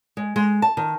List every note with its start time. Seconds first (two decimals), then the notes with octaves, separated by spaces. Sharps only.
0.17 G#3
0.36 G#3
0.62 A5
0.77 D#3